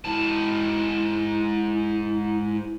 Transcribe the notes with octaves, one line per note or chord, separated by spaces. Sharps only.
G#2 E4 A5